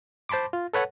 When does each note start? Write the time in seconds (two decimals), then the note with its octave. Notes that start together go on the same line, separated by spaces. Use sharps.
0.29 C5 A5 B5 C6 D6
0.53 F4
0.73 A4 B4 C#5 F#5